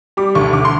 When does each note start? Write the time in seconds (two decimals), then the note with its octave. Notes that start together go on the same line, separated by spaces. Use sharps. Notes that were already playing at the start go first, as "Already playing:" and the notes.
0.17 G3 D6
0.35 D2 C#6
0.53 D2 D6
0.65 C6